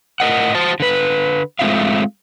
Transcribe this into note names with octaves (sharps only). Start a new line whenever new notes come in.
A2 A#4 D#5 F#5
F#4 C5 A5
D3 B4
G#3 A3 C4 F4 E5 F5